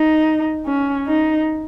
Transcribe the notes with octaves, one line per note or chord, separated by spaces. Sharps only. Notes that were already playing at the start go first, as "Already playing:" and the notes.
Already playing: D#4
C#4
D#4